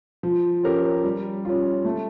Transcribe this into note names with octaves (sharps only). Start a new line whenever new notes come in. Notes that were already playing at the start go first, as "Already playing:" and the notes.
F3
C#4 G4 A#4
G3
C#4 F4
A3